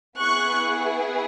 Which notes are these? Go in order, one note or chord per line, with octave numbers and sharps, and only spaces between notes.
B3 E4 G#4 C#6 F#6